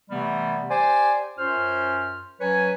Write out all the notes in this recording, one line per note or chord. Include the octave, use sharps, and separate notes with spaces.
C3 E3 G3 A3 B3
G4 C5 D5 G#5
F#2 C#4 F4 C5 F6
F#3 C#4 B4 C#5 G#5